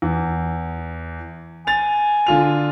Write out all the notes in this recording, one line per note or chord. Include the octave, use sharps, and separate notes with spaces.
E2
G#5 A6 F7
D3 F4 F7